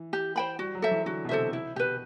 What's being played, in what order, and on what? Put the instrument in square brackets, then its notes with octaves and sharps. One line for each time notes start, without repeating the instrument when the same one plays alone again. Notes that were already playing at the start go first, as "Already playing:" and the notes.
Already playing: [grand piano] E3
[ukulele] G4
C5 G5 B5
[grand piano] G3 [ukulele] F#4
[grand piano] F#3
[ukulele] A4 C5 E5
[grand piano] E3
[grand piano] D3 [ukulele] F#4
[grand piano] B2
[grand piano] C3 [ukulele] A4 C5 E5
[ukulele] E4
[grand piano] B2 [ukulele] G4 B4